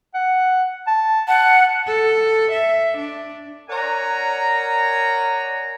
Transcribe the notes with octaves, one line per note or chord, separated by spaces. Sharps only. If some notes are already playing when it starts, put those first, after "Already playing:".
F#5
A5
F#5 A5
A4
E5
D4
A#4 C#5 D5 F#5 G#5 A#5